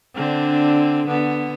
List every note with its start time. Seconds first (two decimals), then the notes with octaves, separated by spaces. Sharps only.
0.15 D3 C4 D4
1.07 D3 B3